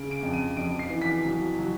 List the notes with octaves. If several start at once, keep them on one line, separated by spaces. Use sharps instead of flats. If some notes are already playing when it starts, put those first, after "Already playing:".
Already playing: C#3 D7
D7
F2
D#7
F2 D7
C7
E3
B6
F#3
F#3